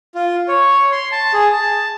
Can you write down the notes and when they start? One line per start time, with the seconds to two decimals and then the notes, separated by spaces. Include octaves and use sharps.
0.15 F4
0.48 C#5
0.92 C6
1.12 A5
1.33 G#4
1.52 A5